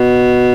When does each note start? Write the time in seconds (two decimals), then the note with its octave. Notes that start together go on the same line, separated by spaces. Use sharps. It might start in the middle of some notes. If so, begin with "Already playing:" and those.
Already playing: B2